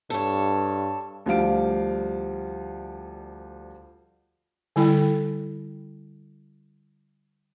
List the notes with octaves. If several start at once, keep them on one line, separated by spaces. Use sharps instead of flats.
G2 A4 C#5
D2 F3 G3 F5 D7
D3 G3 E4 A4 G5